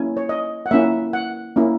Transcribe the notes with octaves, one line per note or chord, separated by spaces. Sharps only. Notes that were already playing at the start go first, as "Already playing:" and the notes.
Already playing: A#3 C#4 E4 G#5
C#5
D#5
F#5
A#3 C#4 E4 E5
F#5
A#3 C#4 E4